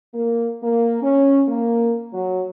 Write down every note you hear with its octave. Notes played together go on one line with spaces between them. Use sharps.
A#3
A#3
C#4
A#3
F#3